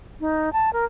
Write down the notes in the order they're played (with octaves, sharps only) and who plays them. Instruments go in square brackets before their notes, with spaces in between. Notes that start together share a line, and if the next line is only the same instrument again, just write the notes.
[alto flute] D#4
A5
A#4